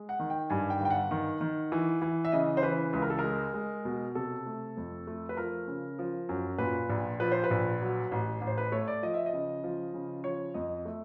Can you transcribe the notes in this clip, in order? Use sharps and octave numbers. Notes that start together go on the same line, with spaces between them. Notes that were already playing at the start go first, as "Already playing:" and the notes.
Already playing: G#3
F#5
D#3
G5
G2 G#5
G5
G1
G5
F#5
D#3
D#3
E3
E3
E5
C#3 D#5
C5
E3 B4
C#2 B4
A#4
A4
G#3 A#4
G#3
B2
C3 A4
A3
F2
A3
B4
F3 A#4
C#3
F3
F#2
A#2 B4
A#1
F3 B4
C5
B4
A#1
F#3
A1
A1
C5
B4
A3 C#5
D5
F3 D#5
E5
D#5
C#3
F3
C#3
F3 C#5
F2 D#5
A3 E5